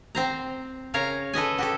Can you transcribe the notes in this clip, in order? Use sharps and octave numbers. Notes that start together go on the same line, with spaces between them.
C4 C5 A#5
C#3 A#4 C#5 F5 A#5
A4 B4 D#5 G#5
F#4 G4 A4